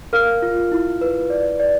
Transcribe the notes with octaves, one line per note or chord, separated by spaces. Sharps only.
A#4 F5 F6
F4
E4
B4
D5
D5